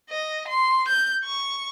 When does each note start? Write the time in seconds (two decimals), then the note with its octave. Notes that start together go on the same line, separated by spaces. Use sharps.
0.10 D#5
0.48 C6
0.88 G6
1.24 C#6